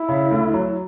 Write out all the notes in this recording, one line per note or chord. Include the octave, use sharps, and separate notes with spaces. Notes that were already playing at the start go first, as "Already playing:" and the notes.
Already playing: E4
C#3
D2
F#3